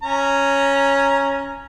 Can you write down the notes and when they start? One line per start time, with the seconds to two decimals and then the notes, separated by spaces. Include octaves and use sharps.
0.03 C#4 A#5